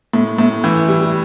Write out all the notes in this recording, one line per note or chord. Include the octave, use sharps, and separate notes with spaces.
A2
A2
E3
G3